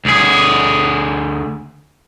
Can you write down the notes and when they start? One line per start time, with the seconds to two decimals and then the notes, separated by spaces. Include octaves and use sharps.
0.05 D2 G#4